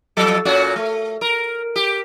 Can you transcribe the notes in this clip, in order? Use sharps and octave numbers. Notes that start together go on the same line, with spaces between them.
F2 F#3 A4
A#2 C#4 F#4
A3
A#4
G4